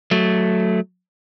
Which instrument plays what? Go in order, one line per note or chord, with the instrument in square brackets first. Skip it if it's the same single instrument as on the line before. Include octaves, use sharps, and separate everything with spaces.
[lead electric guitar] F#3 A3